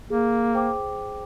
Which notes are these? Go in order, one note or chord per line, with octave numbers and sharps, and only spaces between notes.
A#3 G#4
C5 G5 D6